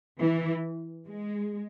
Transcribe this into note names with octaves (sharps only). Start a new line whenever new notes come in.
E3
G#3